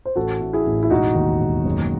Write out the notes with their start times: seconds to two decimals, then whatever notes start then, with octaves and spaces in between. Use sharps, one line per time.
0.05 C5
0.16 A1 F#4 A4
0.40 A2
0.53 E4 G#4
0.66 A1
0.83 E4
0.90 E1 D#4 F#4
1.15 D#2
1.40 E1
1.65 F#1